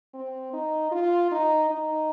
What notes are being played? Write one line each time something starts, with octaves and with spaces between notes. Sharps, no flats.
C4
D#4
F4
D#4
D#4